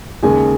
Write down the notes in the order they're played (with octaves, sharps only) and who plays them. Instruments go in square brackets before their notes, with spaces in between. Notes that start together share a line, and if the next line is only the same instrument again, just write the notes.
[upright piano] D#2 C#3 G#3 G#5